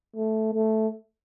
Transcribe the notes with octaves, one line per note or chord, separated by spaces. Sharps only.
A3
A3